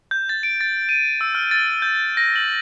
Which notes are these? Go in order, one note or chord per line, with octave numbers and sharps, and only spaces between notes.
G6
A6
D7
A6
D#7
E6
F6
A6
G6
A#6
F#7